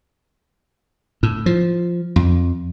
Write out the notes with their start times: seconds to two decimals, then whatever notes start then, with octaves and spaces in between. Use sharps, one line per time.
1.23 A2
1.46 F3
2.16 F2